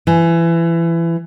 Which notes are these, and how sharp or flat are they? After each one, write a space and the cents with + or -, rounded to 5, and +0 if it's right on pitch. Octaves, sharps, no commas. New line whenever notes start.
E3 +25